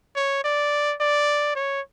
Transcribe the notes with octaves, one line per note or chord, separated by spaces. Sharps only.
C#5
D5
D5
C#5